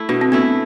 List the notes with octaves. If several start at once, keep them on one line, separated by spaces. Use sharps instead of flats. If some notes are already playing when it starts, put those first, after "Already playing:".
Already playing: A3 E4
B2 D4
C4
A3 B3 D4 E4